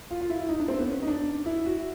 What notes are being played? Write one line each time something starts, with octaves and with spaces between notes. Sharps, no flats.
F4
F4
E4
E4
D#4
D4
C4
B3
C#4
D#4
D4
E4
F#4